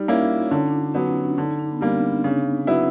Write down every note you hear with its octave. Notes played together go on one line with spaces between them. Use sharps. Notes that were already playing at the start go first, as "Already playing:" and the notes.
Already playing: G3 D#4
A#3 C#4 E4
F4
D3 C#4
D4
C#4
F#3 B3 C#4
C#4
D4
D3 D#4
D4
B3
G3 A#3 C4
C#3 D4
F#3 B3 C4 E4